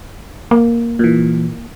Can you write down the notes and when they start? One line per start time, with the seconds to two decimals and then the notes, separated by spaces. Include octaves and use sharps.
0.51 A#3
0.99 A#2 E3